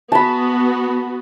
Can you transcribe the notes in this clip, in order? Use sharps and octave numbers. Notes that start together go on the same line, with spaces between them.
B3 F#4 A5 B5